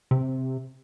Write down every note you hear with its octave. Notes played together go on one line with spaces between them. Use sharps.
C3